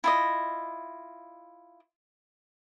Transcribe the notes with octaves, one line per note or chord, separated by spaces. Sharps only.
E4 F4 D#5